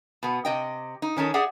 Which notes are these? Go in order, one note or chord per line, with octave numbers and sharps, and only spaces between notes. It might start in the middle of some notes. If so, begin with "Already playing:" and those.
B2 B3
C3 D#5 G5
D#4
D#3 C#4 D#4 A4
G4 G#4 D5 E5 F#5